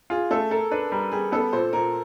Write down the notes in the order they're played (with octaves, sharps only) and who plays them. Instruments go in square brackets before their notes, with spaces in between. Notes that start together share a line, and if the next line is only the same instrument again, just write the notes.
[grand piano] F4 [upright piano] G#4
[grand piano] A3 [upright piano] A4
[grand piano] A4 [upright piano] A#4
[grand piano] D4 [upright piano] B4
[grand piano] G3 [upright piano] A#4
[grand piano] G3 [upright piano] G#4
[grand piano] B3 [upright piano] A4
[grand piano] A#2 [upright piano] C5
[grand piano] A#2 [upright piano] A#4